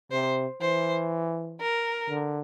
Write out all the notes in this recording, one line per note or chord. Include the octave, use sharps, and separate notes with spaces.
C3 C5
E3 C5
A#4
D3